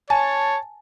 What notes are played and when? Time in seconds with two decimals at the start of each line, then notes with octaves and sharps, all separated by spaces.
0.10 C#5 G#5 A5